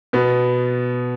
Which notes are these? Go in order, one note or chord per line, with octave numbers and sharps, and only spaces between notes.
B2 B3